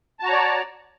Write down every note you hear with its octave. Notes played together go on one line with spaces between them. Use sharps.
F#4 C#5 D5 A5 A#5